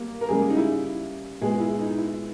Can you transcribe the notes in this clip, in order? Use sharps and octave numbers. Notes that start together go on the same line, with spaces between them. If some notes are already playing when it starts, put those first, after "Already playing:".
Already playing: G3 A#3
A#4
C#3 G3 G#3 A#3 G#4
D#4
E4
A#2 G#3 B3 G#4
E4
D#4
E4